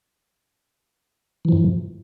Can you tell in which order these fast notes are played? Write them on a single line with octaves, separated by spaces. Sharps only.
E3 F3 G2